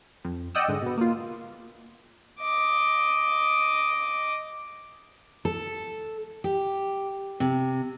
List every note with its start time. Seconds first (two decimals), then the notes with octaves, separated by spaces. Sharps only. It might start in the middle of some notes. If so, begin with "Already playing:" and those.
0.24 F2
0.55 D5 D#5 F#5 G5 D#6 E6
0.68 G#2 D3 G#3
0.82 B2 B3
0.98 A#3 F4
2.40 D#5 D6
5.45 A4
6.44 G4
7.40 C3